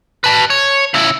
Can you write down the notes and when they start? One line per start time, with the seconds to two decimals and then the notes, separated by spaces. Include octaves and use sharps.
0.24 B4 A5
0.50 C#5
0.94 C#3 E4